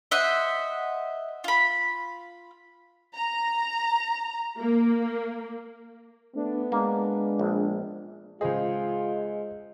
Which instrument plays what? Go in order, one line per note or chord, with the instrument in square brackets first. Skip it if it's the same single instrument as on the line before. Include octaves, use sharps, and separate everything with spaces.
[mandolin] C5 D#5 E5 F#5
F4 B5
[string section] A#5
A#3
[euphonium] A3 [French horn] B3 [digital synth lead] D4
[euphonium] G#3 [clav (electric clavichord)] A#3 [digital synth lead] D4
[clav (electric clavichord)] A#1
[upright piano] C#2 G#4 [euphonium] G#3 [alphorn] F4 [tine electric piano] C5 D#5